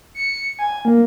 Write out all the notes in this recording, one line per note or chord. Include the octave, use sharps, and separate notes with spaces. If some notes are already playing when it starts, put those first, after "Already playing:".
C#7
G#5
A#3